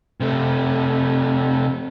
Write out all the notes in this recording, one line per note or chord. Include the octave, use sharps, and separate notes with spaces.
C3 A3